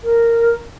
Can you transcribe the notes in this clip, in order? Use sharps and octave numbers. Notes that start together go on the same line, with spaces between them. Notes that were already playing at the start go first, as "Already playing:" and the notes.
A#4